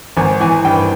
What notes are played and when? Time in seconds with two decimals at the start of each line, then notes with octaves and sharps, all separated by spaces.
0.17 G#1 G#5
0.40 E3 G#5
0.65 G2 G5